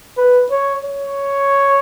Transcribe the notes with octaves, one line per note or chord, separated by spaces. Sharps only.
B4
C#5
C#5